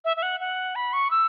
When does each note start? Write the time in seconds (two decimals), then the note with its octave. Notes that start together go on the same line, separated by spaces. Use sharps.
0.05 E5
0.17 E5
0.23 F#5
0.40 F#5
0.76 B5
0.93 C#6
1.11 E6